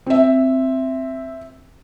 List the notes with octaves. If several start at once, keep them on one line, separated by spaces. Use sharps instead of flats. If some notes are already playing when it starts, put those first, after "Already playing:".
C4 E5